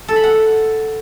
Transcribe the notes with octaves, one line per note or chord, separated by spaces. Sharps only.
A4
B5
F#5